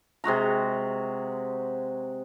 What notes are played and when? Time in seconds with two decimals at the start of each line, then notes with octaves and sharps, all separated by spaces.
0.24 C3 G#3 F#4 A#5